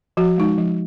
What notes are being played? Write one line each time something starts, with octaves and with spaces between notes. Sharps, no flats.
F3 F#4
G#3 D#4
F3